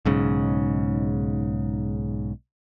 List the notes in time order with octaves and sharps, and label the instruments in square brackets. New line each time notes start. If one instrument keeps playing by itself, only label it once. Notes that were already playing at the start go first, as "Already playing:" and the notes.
[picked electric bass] B1 G#2 C#3